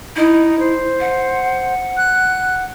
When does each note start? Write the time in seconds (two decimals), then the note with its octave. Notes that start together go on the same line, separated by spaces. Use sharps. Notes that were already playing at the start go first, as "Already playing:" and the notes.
0.16 D#4 E4
0.59 C5
1.00 F#5
1.97 F#6